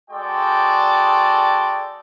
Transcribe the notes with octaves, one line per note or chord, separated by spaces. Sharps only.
G#3 F#4 A4 D5 G5